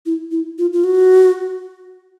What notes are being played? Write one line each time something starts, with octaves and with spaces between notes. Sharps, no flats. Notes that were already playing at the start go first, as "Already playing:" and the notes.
E4
E4
F4
F4
F#4